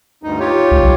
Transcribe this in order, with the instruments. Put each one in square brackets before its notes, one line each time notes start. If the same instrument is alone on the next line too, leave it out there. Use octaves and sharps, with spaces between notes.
[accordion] D2 G2 D#4
F4 G4 C#5
[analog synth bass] C#2
B1